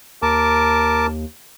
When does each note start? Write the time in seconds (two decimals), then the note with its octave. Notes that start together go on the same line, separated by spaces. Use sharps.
0.22 D#2 A#4 A5 D6